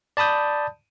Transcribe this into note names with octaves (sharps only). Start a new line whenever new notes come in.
D5 A5 B5 D#6 G6